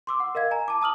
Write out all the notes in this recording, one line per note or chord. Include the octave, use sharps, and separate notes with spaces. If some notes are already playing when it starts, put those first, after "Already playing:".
C6 D6 E6
F#5
A#4 D#5 F5 G#6
G#5 A#5
A5 D6
A5 D#6 F6 F#7